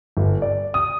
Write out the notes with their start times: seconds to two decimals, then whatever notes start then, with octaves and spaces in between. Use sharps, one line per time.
0.17 G1
0.42 D5
0.74 D#6